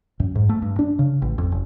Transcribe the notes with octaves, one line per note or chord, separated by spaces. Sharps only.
F#2
G#2
A3
G2
D4
C#3
A1
F2
F#1